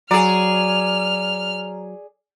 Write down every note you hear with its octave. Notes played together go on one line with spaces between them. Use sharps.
F#3 G#4 D5 A#5 F6